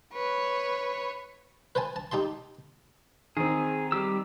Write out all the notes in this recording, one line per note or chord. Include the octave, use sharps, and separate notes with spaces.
B4 C#5
B4 C5 G#5 A5
A5
D#4 G4 A5 C6
D#3 C4 G#4
G3 G4 E6